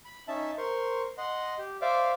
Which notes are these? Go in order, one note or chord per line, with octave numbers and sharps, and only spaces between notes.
B5
C#4 D#4 E5 A5
A#4 C5 C6 C#6
D#5 F#5 C6
G4
C5 D5 E5 F5 D6